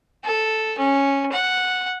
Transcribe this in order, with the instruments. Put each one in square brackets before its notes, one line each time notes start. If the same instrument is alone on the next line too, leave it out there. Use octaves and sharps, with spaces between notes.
[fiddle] A4
C#4
F#5